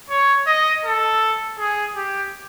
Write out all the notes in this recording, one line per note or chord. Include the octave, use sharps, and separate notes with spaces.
C#5
D#5
A4
G#4
G4